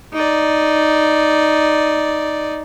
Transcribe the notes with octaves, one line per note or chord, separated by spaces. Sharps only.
D#4 D5